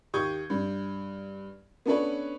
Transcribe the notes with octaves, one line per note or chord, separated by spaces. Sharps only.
D#2 G4 C#6 D#6 G6 G#6
G2
B3 C#4 D4 A4 B4 C#5